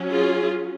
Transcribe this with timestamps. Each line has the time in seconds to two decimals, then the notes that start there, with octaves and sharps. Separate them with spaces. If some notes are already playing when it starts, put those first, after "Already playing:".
Already playing: F#3 C#4
0.10 F4 G#4